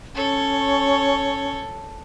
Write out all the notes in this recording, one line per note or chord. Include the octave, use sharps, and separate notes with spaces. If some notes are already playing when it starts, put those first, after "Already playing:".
C#4 A4 C#5